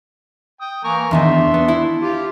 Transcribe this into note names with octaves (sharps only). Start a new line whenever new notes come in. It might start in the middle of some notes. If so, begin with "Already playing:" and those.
G5 D#6
E3 A#3 A#4 G#5 C#6
E2 D#3 D4 D#4 E5 C6
B3
E4
F4 G4